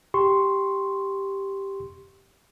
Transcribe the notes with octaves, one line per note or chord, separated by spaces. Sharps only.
G4 C6 C#6